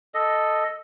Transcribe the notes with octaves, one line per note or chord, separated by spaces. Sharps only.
A4 D#5